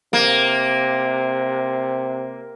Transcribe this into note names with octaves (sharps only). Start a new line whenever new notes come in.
C3 A#3